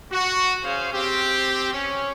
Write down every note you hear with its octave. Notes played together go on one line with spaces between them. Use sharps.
F#4
C#4 G#4 C5 F5
C4 G4
C#4